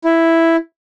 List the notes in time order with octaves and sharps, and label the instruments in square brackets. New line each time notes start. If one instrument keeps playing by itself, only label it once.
[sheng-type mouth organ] E4